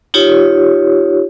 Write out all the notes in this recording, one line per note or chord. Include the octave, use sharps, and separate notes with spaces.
D#4 F4 G4 C#5